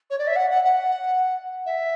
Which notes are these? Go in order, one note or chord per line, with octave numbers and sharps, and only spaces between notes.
C#5
D5
E5
F#5
F#5
F#5
E5